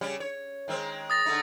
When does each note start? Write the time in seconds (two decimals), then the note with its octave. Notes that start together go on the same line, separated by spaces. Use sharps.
0.01 C#3 G3 C#4
0.20 C#5
0.68 D#3 G#3 C4
1.10 D#6 A6 A#6
1.26 D3 A3 D#4